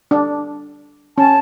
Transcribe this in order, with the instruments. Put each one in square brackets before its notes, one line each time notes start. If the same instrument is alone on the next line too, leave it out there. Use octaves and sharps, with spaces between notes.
[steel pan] D4
[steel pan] C#4 [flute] A5